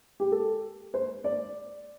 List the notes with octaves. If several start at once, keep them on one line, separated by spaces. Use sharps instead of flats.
G4
A4
C5
D5